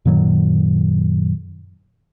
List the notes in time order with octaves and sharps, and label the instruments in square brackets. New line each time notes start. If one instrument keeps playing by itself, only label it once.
[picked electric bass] F#2 A#2 D#3 F#3